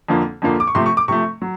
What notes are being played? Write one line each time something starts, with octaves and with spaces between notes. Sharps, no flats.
F2 D3 F3 A#3
F2 D3 F3 A#3
D6
C#6
C3 F3 A3 C6
C#6
D6
C3 F3 A3 C#6
F#3